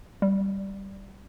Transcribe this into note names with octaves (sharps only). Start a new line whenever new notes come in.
G3